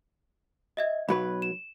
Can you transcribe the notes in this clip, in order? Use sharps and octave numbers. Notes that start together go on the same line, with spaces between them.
D#5 E5 G#6
B1 F#3 B4 B5
E7